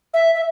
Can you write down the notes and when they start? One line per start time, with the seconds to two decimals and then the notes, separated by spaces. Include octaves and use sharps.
0.14 E5
0.35 E5